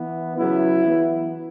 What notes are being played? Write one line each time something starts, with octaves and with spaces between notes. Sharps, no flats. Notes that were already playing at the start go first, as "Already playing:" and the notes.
Already playing: E3 B3
C#3 F#3 B3 E4
E3 B3